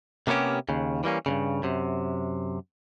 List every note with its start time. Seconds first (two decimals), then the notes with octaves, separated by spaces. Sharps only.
0.27 C3 A#3 B3 C#4 G4
0.69 D#2 C#3
1.04 E3 G3 A#3 C#4
1.26 G2 A#2 C#3
1.63 F#2 C3